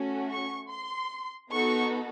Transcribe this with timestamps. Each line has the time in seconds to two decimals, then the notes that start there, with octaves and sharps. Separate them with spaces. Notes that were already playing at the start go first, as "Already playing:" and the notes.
Already playing: A3 C#4 F#4
0.30 C#6
0.71 C6
1.53 B3 D#4 F#4 A4 C#6